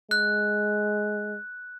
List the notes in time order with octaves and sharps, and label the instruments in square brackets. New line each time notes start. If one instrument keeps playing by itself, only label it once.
[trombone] G#3 [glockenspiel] F#6